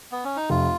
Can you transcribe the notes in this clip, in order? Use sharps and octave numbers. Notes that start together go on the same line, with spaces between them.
B3
C#4
D#4
F1 F4